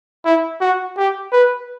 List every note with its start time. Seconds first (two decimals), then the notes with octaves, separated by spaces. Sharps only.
0.25 E4
0.61 F#4
0.97 G4
1.33 B4